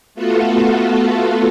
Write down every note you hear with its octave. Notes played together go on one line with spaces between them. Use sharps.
A3 B3 F4 F#4 A4